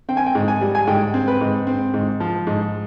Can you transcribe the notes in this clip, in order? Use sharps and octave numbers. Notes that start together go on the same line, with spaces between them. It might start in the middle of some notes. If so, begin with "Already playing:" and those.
C4 G5
G#5
G5
G#2
G#5
G3
G#5
G#2 G5
C4
B4
G#2
C4
G#2
F3
G#2